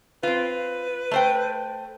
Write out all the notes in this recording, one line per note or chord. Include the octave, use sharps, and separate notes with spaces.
C4 F4 B4
A3 C5 G5